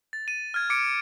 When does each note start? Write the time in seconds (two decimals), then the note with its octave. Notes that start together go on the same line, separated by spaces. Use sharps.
0.13 A6
0.28 D#7
0.54 F6 G#6
0.70 D6 C#7 D7